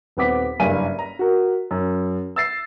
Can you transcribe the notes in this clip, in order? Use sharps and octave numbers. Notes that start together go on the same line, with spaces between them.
D#1 B3 C4 F#5 D6 B6
F#1 G2 F5 G#5 D#7
A#5
F#4 A#4
F#2
E6 A6 C7